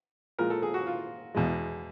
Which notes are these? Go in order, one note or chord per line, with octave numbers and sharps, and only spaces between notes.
A#2 F3 G#3 A#4
A4
G#4
F#4
F4
E2 B2 G#3